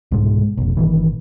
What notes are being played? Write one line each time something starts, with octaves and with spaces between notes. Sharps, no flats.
C2 G#2 B2 G#3
F1 B1
G1 A#2 D#3 E3